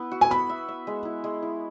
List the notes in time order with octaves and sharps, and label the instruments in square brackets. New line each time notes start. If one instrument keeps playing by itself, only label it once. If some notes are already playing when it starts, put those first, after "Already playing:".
Already playing: [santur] B3 E4 B4
F#4
[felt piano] G#5
[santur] B3 [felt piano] B5
[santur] E5
E5
G#3
E4
G#3
E4